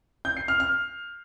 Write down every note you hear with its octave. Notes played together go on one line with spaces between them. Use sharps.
G6
C7
F6
F6